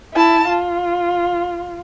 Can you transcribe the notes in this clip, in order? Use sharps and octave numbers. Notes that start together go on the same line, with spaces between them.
E4 A5
F4